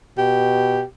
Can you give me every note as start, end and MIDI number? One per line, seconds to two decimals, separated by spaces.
0.18 0.83 47
0.18 0.83 67